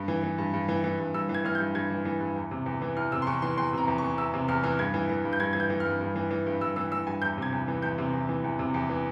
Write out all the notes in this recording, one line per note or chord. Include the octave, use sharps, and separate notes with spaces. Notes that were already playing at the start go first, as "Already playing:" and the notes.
Already playing: G2
E3
E3
G2
G2
E3
E3
G2
G2 E6
E3
G#6
E3 F6
G2 G6
G2 G#6
E3
E3
G2
E2
C3
E2
E3
E2 F6
C3 E6
C6
E2 C#6
E3 C6
E2 C6
C3 A#5
E2
E3 C#6
E2 E6
C3
E2 F6
E3 F6
G2 G#6
E3
E3
G2
G6
G2 G#6
E3 G#6
G6
E3
G2 F6
G2
E3
E3
G2
G2 E6
E3 E6
E3 E6
G2 G#5
E2 G6
C3 G#6
E2
E3
E2 G6
C3
E2
E3
E2
C3
E2
E3